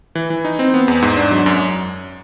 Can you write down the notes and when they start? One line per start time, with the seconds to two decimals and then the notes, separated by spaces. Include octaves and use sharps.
0.15 E3
0.30 E3
0.45 D#4
0.59 C4
0.74 B3
0.88 E2
1.02 G#2
1.17 D4
1.31 F#3
1.46 F#2